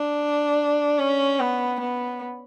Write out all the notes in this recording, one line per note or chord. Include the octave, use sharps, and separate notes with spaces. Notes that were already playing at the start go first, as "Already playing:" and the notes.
Already playing: D4
C#4
B3
B3